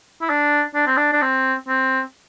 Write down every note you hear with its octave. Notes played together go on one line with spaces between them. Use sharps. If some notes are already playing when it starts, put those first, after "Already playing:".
E4
D4
D4
C4
D4
D4
C4
C4